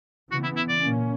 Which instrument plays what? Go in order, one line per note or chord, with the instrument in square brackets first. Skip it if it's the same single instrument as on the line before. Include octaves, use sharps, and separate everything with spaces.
[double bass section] C#3 E3 B3 [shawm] F#4
[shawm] E4
E4
D5
[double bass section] A#2 A#3 C#4